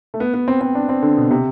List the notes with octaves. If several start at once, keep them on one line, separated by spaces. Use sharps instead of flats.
A3
B3
B3
C4
C4
D4
C4
D3
B2
C3